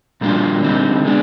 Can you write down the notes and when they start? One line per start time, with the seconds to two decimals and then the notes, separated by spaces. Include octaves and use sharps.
0.21 A#2 G3 A#3 D4 F4
0.62 D3 G3 C4 D#4
1.04 G#3 B3 D4